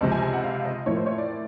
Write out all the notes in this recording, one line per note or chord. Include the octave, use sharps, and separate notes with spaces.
C#2 C3 F3 G#3 A5
G#5
G#5
F#5
F5
D#5
A2 F3 A#3 C#5
C5
C#5
D5